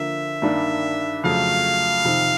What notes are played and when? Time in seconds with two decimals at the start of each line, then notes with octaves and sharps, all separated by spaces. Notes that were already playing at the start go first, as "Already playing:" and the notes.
Already playing: D3 F3 A#3 E5
0.42 G2 D#3 G3 A#3 D4
1.23 F2 C#3 F#3 A3 F5
2.04 F2 C3 D#3